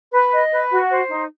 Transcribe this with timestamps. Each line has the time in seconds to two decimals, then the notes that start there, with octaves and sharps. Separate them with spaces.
0.14 B4
0.33 D#5
0.52 B4
0.71 F#4
0.90 C5
1.09 D#4